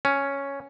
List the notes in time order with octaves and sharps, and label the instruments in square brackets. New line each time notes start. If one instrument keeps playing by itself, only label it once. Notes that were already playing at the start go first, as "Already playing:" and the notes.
[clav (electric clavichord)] C#4